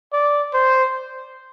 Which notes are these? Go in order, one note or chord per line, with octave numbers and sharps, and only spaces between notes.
D5
C5